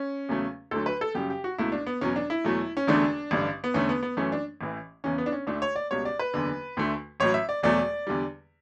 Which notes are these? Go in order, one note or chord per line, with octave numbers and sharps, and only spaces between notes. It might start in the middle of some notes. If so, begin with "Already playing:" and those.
Already playing: C#4
E2 C#3 F#3 A3
D2 D3 F#3 A3 A4
B4
A4
F#2 C#3 G3 G4
G4
F#4
C#2 B2 A3 E4
D4
B3
E2 B2 F#3 C#4
D4
E4
E2 B2 F#3 A3
C#4
E1 E2 D3 A3 D4
A1 G2 D3
B3
E2 D3 A3 C#4
B3
B3
F#2 E3 A3 C#4
D4
A1 A2 E3
E2 C#3 E3 C#4
B3
D4
C#4
D2 D3 A3 D4
C#5
D5
C#2 B2 G3 C#5
D5
B4
F#1 E2 D3
D2 D3 A3
A1 A2 F#3 C#5
E5
D5
E1 E2 B2 F#3 A3 D5
E2 D3 G3